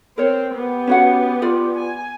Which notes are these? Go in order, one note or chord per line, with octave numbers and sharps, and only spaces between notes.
C4 A#4 C#5
B3 G4
C#4 F#4 F#5
F4 D5
G#5